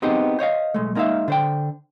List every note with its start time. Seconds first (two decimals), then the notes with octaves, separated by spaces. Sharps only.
0.02 B3 C4 D#4 G4 G#4 C5
0.39 C5 C#5 D#5 F5
0.74 B1 G#3 A3
0.95 G#3 A#3 D#4 A4 E5 F5
1.28 D3 C5 G5